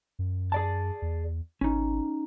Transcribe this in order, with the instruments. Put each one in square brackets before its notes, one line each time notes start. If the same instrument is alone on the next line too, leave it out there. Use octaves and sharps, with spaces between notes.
[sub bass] F#2
[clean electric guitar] G#4 D5 A5
[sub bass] E2
[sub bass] G#1 [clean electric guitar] C#4 D#4